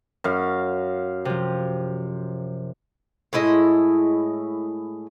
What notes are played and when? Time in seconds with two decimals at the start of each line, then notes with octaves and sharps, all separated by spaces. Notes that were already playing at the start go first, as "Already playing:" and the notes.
0.24 F#2 F5
1.25 C3 F3
3.33 A2 G#3 E4 D#5